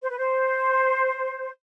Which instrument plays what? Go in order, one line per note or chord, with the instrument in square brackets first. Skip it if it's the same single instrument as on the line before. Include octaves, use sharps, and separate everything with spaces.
[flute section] C5
B4
C5